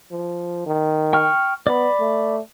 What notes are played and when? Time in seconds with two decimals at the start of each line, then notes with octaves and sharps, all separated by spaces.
0.12 F3
0.66 D#3
1.13 G5 C#6 F6
1.67 B3 D5 B5
2.00 A3